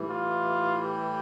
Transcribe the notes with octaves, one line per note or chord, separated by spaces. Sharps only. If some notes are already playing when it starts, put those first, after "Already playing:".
Already playing: A2 E3 G3
F4
G4